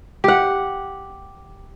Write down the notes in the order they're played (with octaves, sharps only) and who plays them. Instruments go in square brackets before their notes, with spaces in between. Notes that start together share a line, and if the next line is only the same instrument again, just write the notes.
[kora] G4 F#5